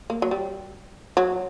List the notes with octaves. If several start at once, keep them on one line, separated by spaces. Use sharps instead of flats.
A#3
F#3
G3
F#3